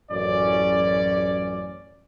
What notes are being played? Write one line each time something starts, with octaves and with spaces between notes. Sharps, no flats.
A1 F#2 C#4 D5